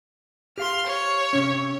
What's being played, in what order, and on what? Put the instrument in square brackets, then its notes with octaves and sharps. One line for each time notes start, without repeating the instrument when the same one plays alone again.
[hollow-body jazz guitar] G4 F5 [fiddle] C6 F6
[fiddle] C#5
[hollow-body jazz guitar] C3 C#4